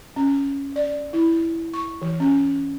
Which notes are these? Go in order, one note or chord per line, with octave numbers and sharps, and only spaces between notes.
C#4
D5
E4
C#6
E3
C#4